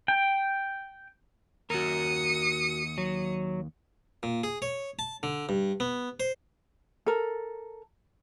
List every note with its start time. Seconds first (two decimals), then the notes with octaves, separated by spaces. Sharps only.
0.08 G5
1.70 D#2 F#4 A#4 D#6 C#7
2.98 F#3
4.23 A#2
4.44 G#4
4.62 C#5
4.99 A5
5.23 D3
5.49 G2
5.80 B3
6.20 C5
7.06 A4 A#4